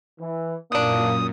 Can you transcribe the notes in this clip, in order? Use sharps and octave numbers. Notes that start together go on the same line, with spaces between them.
E3
F#2 A#2 E3 A#3 D4 D#6